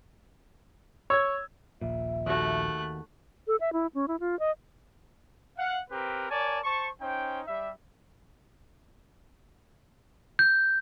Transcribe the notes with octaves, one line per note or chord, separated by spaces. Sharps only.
C#5 E6 G#6
D#1 A#1 A#2 E5
D#2 A3 F#4 F#6
A4
E5
E4
C#4
E4
F4
D#5
F5 F#5
C4 G4 A#4 B4
A#4 C#5 D5 G#5 A5
C5 A5 C#6
C#4 D#4 C5 G5
G3 E5
G6